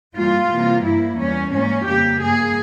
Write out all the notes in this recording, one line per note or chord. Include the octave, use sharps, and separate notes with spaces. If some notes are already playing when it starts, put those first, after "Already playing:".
G2 E3 G3 A#3 F4
C3 E3 G3 A#3
G2 F3 A#3 E4
E2 E3 G3 C#4
G#2 G3 A#3 C#4
F2 C#3 G3 A#3 G4
G2 F3 A#3 G#4